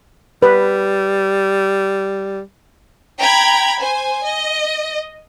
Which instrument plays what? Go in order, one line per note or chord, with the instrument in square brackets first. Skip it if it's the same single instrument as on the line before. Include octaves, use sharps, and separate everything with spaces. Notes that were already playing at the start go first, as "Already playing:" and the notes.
[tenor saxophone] G3 [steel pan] B4
[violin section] G5 A#5 B5 G#6
C5 G#5
D#5